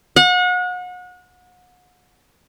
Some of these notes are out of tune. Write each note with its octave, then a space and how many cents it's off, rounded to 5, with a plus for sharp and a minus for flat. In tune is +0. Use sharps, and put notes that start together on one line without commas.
F#5 -35